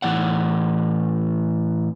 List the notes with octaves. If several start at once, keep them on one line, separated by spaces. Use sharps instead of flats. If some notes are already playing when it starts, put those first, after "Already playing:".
A2 E3 C4 D5 F#5